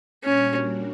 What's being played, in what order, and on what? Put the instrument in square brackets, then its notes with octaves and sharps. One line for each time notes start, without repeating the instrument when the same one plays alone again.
[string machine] A#2 G3 A#3 D4 F#4 [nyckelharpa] C#4